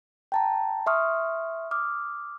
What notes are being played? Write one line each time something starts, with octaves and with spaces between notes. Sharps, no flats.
G5 A5 A#5
E5 C6 C#6 D#6 F6
D6 D#6 F6